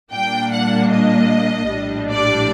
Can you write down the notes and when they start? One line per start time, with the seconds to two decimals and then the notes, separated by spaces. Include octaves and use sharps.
0.11 A#2 G3 A#3 D4 G5
0.52 F#5
0.92 D#5
1.71 A#1 A2 G3 D4
2.11 D5